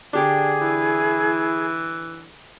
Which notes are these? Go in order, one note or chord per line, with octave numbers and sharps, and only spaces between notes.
D3 D4 G4 G#4 D6
E3 E4